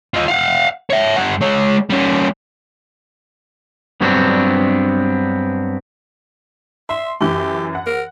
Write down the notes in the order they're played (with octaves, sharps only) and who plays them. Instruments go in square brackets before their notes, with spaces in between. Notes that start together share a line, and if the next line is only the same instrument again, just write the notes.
[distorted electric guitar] F4 D#5
F5 F#5
C#5 E5
G2 F#5
G#3 C#5
G3 C#4
[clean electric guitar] G2 F#3 B3 C4 D4
[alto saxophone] E5 [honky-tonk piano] C6
[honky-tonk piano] F#2 E3 [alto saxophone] G4
[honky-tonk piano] F#5
[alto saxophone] A#4